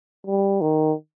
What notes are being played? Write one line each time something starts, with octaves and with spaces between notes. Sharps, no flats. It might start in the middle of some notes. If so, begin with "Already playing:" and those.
G3
D#3